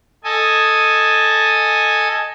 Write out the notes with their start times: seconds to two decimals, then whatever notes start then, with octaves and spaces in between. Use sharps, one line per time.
0.24 A4 D#5 G#5